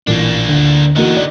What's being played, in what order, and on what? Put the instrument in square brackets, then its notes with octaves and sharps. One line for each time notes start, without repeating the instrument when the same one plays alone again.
[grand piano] A1 A#2 [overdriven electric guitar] A#3 D4
[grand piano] D2
[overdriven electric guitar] D3 D#4 [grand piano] E3 A#3 F#4
[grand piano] D5